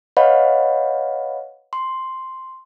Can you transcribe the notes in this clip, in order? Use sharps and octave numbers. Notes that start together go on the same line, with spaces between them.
B4 C#5 D#5 F5 F#5 B5
C6